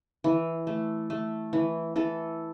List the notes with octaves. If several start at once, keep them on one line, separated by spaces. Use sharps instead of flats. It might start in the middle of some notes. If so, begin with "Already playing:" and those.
E3
A3
A3
E3
E3 A4